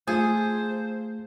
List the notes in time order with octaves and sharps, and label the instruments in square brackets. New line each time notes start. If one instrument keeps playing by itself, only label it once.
[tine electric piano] A3 [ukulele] F4 A4 [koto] G#4 [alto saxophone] C5